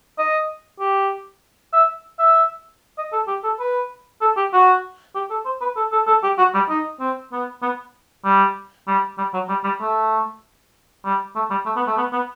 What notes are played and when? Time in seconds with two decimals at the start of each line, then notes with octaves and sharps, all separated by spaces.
0.18 D#5
0.80 G4
1.73 E5
2.19 E5
2.98 D#5
3.12 A4
3.28 G4
3.44 A4
3.59 B4
4.21 A4
4.37 G4
4.53 F#4
5.15 G4
5.30 A4
5.45 C5
5.61 B4
5.77 A4
5.92 A4
6.07 A4
6.23 G4
6.38 F#4
6.54 G3
6.69 D#4
7.00 C4
7.32 B3
7.62 B3
8.25 G3
8.88 G3
9.18 G3
9.33 F#3
9.49 G3
9.64 G3
9.80 A3
11.05 G3
11.36 A3
11.50 G3
11.66 A3
11.76 B3
11.87 A3
11.97 B3
12.13 B3